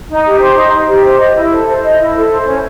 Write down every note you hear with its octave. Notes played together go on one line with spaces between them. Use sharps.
D#4
G4
C5
D#4
D#4
G4
C5
D#5
E4
A4
C5
D#5
E4
A4
C5
C#4